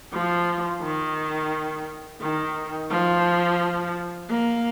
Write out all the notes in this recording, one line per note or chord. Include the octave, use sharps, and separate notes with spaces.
F3
D#3
D#3
F3
A#3